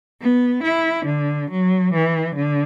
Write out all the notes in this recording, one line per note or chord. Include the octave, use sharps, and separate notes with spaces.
B3
E4
D3
F#3
E3
D3